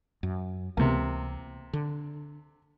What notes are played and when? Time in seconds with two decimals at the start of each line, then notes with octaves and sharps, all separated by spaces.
0.23 F#2
0.77 C#2 C3 E3 A#3
1.73 D3